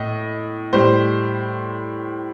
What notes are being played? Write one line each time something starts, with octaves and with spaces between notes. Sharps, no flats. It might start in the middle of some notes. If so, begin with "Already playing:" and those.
Already playing: A2 D#5
A2 G3 C5